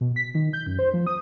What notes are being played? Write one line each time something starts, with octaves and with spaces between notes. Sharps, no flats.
B2
B6
D#3
G6
F#2
C5
F3
D#6